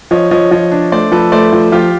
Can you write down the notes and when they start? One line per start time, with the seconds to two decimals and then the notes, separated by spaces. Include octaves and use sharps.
0.11 F3 C#5 D#5
0.31 F3 C#5 D#5
0.51 F3 C#5 D#5
0.72 D4
0.92 A3 C5 D5
1.12 F3 A4 B4
1.32 A3 C5 D5
1.53 F3
1.72 F3 F4 G4